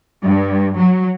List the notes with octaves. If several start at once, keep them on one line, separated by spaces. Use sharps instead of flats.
G2
F#3